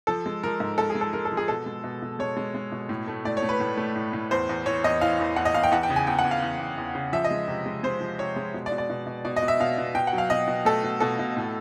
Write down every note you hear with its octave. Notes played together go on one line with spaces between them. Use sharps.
F3 A4
G#3
F3 A#4
G#2
G#2 A4
G#4
G#3
A4
G#3 A#4
A4
F3
G#4
B2 A4
G#3
B2
B2
G#3 C#5
G#3
G#3
B2
A2
A3
A2 D5
C#5
A3
B4
A2
A3
A2
A2
E2 C5
E2
E3 C#5
E2 D#5
E3 F5
E2
E2 F#5
D#5
E2 F5
G5
E2 F#5
G5
C#3
G#5
E2 G5
F#5
E2
F5
E2
E2
E2
C#3
F3 E5
D#5
G#3
C3
G#3
G#3 C5
F3
C3 C#5
G#3
B2
D5
B2
D5
B2
B2
B2 D5
D#5
B2
E5
B2 F5
B2
B2 G5
F#5
F#3
F5
B2 D#5
B2
A3 A4
B2
B2 A4
B2
A2